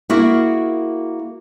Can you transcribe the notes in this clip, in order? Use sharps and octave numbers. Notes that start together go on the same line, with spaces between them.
A#3 E4 F#4 G#4 A#4